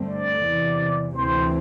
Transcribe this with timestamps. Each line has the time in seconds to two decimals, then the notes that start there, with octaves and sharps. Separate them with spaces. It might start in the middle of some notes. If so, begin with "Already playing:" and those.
Already playing: G2 D3 A3 C4
0.08 D5
0.44 E2 C3 E3
1.15 D2 C3 E3 A3 C4 C5